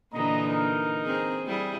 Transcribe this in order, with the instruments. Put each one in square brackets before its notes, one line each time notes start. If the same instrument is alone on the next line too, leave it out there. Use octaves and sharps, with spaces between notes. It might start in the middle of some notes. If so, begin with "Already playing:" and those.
[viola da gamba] A#2 D3 E3 [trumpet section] D#5 A#5
[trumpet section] D#4 A#4
[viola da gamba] C4 G#4
G3 E4 G#4